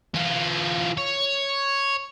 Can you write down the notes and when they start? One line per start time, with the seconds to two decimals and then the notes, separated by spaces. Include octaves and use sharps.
0.14 E3 F4
0.97 C#5